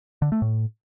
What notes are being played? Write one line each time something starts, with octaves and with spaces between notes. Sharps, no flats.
D3
A3
A2